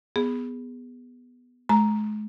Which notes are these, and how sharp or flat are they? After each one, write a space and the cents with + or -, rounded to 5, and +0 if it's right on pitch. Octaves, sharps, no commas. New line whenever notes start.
B3 +0 G#4 -10
G#3 +40 A#5 +0